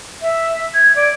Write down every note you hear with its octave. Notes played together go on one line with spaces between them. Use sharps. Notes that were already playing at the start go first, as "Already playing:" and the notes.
E5
G#6
D5